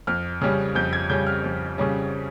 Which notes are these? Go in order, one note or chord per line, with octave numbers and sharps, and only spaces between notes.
F2 F6
C#3 G3 C#4 F6
F2 G6
G#6
C#3 G3 C#4 G6
F6
F2
C#3 G3 C#4